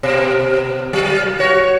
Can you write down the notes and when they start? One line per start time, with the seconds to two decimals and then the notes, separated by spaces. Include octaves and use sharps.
0.03 B2
0.93 F#3
1.39 F#4 C#5